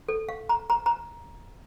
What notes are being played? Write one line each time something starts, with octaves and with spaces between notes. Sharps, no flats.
A4
F5
A#5
A#5
A#5